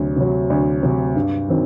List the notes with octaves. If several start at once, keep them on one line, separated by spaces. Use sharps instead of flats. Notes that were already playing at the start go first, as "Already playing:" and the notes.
Already playing: D2 C3 F#3
C3 F#3
D2
C3 F#3
G2
D#3 F#3 C4 D#4